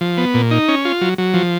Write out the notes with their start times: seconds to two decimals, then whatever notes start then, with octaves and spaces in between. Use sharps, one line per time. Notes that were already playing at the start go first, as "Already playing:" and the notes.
0.01 F3
0.17 B3
0.34 A#2
0.51 D#4
0.68 C#4
0.85 F4
1.01 F#3
1.18 F#3
1.34 F3